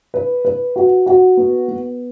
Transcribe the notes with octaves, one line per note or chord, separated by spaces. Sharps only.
B4
B4
F#4
F#4
B3
B3